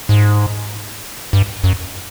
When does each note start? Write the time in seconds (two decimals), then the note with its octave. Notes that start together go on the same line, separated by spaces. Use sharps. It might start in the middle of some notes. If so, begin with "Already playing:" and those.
0.09 G#2
1.33 G2
1.64 F#2